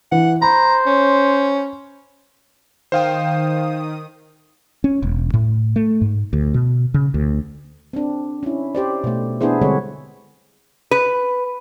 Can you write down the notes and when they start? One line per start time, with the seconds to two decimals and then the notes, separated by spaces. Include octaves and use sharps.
0.12 E3 F#5
0.42 C5 A#5 B5
0.86 C#4
2.92 D#3 C5 F5 G5 D#6
4.84 C#4
5.02 E1
5.34 A2
5.76 A3
6.01 G#2
6.33 D2
6.54 B2
6.94 C#3
7.14 D2
7.93 C4 D4
8.43 C#4 E4
8.75 G4 C5 D5
9.04 B2 A3
9.41 B3 D4 E4 G#4 C5
9.62 D3 G3 G#3 C4 C#5
10.91 B4